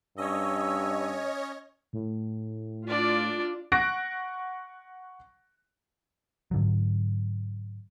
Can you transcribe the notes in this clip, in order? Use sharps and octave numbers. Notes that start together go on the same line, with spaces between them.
G2 C#4 C#5 D#5 E6
A2
D4 F4 D5
F#5 C#6 F#6 A#6 D7
G#2 D3 F#3